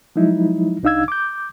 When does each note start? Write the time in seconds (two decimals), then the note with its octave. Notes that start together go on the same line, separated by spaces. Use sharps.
0.16 F3 F#3 G#3 D#4 E4
0.83 C2 D4 D#4 F5 E6 G#6
1.08 D6 G6